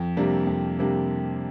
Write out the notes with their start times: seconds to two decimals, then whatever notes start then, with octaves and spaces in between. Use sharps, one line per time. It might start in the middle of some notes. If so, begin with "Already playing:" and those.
Already playing: F2
0.17 C3 G3 A#3 D4
0.47 F2
0.79 C3 G3 A#3 D4